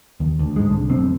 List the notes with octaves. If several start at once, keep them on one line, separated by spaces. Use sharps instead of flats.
D#2
D2
G#2 G#3
C2 D3
F1 B1 A2 C4